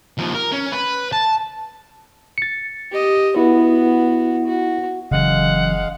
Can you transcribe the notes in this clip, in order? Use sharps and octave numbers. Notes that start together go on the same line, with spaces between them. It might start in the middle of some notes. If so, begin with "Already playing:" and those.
D#2 F3
A#4
C#4
B4
A5
A6 C#7
G4 D#5
B3 E4 F#4
F#4
F#1 C#3 E3 F#3 G#3 F5 F#5